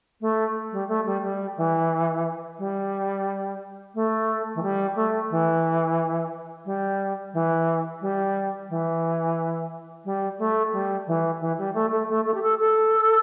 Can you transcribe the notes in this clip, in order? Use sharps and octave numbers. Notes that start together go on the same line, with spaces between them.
A3
G3
A3
G3
G3
E3
G3
A3
E3
G3
A3
E3
G3
E3
G3
E3
G3
A3
G3
E3
E3
G3
A3
A3
A3
A3
G4
A4
A4